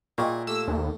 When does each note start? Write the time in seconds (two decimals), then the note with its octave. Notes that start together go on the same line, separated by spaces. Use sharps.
0.18 A#2 E4 G#4 D5 D#5 G5 C#6
0.47 A3 G4 E6
0.68 D#2